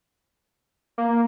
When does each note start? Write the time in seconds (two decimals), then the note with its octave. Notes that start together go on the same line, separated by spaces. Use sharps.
0.98 A#3